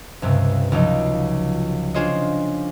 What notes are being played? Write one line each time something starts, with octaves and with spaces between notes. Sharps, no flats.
C#2 G2 C3
C#2 F3 F#3 D#4 D#5
D4 F4 G#4 C5 C#5 D#5